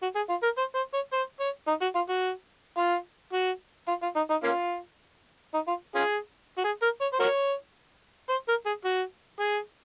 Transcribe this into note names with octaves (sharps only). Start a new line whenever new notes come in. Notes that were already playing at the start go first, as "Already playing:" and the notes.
F#4
G#4
F4
A#4
C5
C5
C#5
C5
C#5
D#4
F#4
F4
F#4
F4
F#4
F4
F4
D#4
D#4
A#3 C#4 F4
D#4
F4
C#4 F4 G#4
F#4
G#4
A#4
C#5
C5
F#4 A#4 C#5
C5
A#4
G#4
F#4
G#4